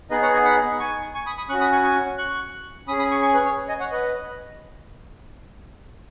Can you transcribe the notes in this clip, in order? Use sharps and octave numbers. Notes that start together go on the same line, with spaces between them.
B3 D#4 G#4 B4 D#5
C#5 F#5
D#5 G#5
F#5 B5
G#5 C#6
G#5 C#6
B5 D#6
B5 D#6
C#4 F#4 C#6 F#6
B5 D#6
G#5 C#6
G#5 C#6
C#6 F#6
C#4 G#4 B5 D#6
B5 D#6
G#5 C#6
G#5 C#6
B4
C#5
D#5 G#5
C#5 F#5
B4 D#5